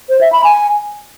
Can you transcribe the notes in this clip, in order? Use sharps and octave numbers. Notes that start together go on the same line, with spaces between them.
C5
E5
B5
G#5